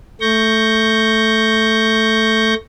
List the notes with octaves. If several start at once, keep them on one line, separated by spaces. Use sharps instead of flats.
A3 C#6 G6 A#6